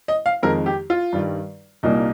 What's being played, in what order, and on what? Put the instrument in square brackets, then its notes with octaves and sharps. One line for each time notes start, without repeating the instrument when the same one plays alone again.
[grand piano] D#5
F5
F2 D#3 G#3 A#4
G4
F4
G2 D#3 G3
C2 A#2 G3 A#3 D#4